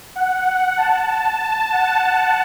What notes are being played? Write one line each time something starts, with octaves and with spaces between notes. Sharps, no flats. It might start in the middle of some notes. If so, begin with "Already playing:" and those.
F#5
A5
F#5